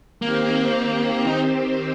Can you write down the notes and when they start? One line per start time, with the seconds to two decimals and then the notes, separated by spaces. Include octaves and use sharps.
0.21 D#3 A#3 C4 G4 C5
1.27 D#4